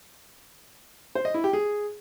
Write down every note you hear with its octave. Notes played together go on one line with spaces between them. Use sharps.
C5
D#5
E4
G4
G#4